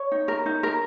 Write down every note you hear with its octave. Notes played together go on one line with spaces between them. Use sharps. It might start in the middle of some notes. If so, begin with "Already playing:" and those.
Already playing: C#5
D#4
A#4
D#4
A#4